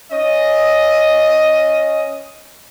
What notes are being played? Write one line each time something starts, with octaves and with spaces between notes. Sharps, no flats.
C#4 D#5